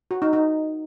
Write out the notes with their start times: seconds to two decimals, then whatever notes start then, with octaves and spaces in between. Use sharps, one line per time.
0.11 F#4
0.22 D#4
0.33 D#4